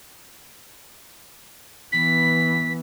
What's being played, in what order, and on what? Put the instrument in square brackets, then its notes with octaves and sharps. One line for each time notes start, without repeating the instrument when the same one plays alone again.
[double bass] E3 B3 [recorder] B6